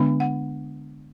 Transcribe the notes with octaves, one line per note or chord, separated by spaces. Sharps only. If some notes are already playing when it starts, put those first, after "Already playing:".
Already playing: D3 G#3 B3 D4
F#5